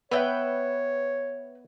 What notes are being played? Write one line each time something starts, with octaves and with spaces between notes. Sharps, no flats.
B3 B4 C#5 E5 G5